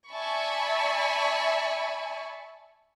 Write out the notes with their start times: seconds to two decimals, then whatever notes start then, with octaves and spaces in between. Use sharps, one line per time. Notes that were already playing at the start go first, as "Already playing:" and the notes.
0.11 D5 E5 G#5 A5 B5 C#6